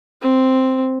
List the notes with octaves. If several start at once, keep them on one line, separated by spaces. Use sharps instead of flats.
C4